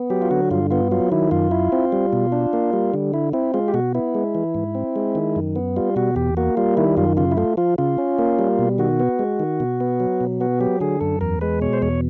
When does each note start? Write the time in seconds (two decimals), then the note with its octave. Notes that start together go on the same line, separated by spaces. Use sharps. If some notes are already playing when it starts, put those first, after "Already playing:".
Already playing: B3
0.10 F#3 G4
0.22 F4
0.31 D3 F#4
0.51 G2 F4
0.71 B3 F4
0.91 F#3 F4
1.12 D#3 E4
1.31 F#2 F4
1.51 E4
1.72 C4
1.92 G3
2.13 B2
2.32 D4
2.53 A#3
2.73 G3
2.94 D3
3.14 E4
3.33 C4 E4
3.54 G#3 F4
3.68 G4
3.74 B2 F#4
3.95 B3 E4
4.15 G#3
4.35 E3
4.55 G#2
4.75 C4
4.96 G#3
5.15 D#3
5.36 F#2
5.56 B3
5.76 G3 F4
5.96 B2 F#4
6.16 E2 G4
6.37 A#3 F#4
6.57 G3 F4
6.77 D#3 E4
6.97 F#2 F4
7.17 C#3 F4
7.32 E4
7.37 A3 F4
7.57 F3 F4
7.78 C#3 F4
7.98 C#4
8.19 A#3
8.39 G3
8.59 B2
8.78 D#3 F#4
9.00 B3
9.19 G#3
9.40 D#3
9.60 B2
9.80 B3
10.00 F#3
10.21 B2
10.40 B3 F#4
10.61 F#3 G4
10.81 D3 G#4
11.01 F#2 A4
11.21 E2 A#4
11.41 G#3 B4
11.62 B2 C#5
11.73 C5
11.82 E2 C#5